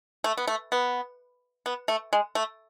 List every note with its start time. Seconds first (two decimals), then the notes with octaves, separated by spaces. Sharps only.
0.24 A3
0.37 B3
0.47 A3
0.72 B3
1.66 B3
1.88 A3
2.13 G#3
2.35 A3